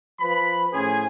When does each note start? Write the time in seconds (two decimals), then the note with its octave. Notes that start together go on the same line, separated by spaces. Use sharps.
0.20 F3 B4 B5
0.72 A2 C#4 G#4 C5 G#5